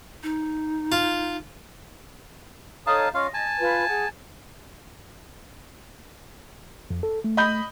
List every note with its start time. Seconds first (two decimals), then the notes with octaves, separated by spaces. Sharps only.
0.23 D#4
0.92 F4
2.87 D#4 A4 C#5 F5 A5 D#6
3.14 C#4 F4 D#5 F5
3.34 G#5 A5
3.60 F4 B4
3.88 G#4 F#5
6.90 F2
7.03 A4
7.24 A3
7.37 D#5 B5 G6